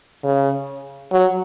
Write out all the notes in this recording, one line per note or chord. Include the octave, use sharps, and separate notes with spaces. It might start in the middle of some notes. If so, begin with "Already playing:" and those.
C#3
F#3